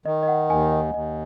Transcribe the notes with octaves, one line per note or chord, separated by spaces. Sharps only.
D#3 D#5
D#5
F#5
D#2 G#5
D#5
D#2 D#5